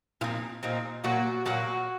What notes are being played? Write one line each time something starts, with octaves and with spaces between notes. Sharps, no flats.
A#2 F3 C4 D#4 F4
A#2 F3 C4 D#4
A#2 F#3 A#3 F#4
A#2 F#3 A#3 F#4